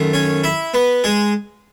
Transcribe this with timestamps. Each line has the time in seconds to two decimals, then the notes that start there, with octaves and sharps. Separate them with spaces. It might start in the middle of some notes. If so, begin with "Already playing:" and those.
Already playing: F#2 D#3 A3
0.13 C#4 C#5
0.44 E4 E5
0.74 B3 B4
1.04 G#3 G#4